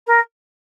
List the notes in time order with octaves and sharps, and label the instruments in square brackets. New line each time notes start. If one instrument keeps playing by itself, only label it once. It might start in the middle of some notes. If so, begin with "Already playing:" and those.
[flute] A#4